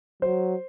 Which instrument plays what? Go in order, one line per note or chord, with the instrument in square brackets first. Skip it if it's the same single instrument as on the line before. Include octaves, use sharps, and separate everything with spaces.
[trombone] F#3 [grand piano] C5